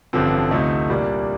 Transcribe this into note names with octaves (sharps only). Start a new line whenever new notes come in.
A1 G2 D3 F3 C4
D2 C3 F3 A3 D#4
C2 A#2 G3 A#3 D4